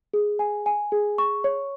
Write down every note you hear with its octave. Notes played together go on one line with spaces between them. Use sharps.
G#4
G#5
G#5
G#4
C#6
C#5